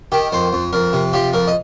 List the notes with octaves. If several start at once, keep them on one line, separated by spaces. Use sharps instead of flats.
D#3 G4
F2 C5
F2
F2 A#4
C3
F3 G4
F2 A#4
D#5